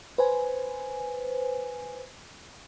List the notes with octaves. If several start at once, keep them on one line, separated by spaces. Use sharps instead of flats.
B4 C5 G#5